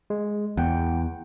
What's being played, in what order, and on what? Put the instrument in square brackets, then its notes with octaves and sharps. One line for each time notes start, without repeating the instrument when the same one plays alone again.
[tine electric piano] G#3
[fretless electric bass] E2 [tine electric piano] F#5 G5